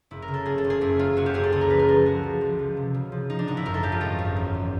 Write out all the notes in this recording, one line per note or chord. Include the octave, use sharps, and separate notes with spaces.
F#1 E4
A#4
C#3
A4
F#1 G#4
A4
F#1
G#4
F#1 E4
F#1 F4
F#1 F#4
G4
F#1 G#4
A4
C#2 G#4
A#4
F3 B4
A#4
F3 A4
C#2 F#4
F3
C#2
F3
C3
C#3
F3
F3 D#4
D4
G#1 D#4
E4
F#2 A#4
A4
F3 G4
F4
G#1 D#4
F#2
E2
E3